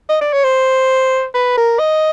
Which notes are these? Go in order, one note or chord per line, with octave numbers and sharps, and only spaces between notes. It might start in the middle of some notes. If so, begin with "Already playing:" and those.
D#5
D5
C#5
C5
B4
A#4
D#5